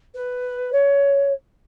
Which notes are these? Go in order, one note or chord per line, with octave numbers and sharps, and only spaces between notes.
B4
C#5